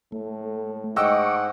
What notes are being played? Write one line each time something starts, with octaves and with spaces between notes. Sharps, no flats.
A2 A3
G#2 D#5 F#5 G5 C#6 D6 E6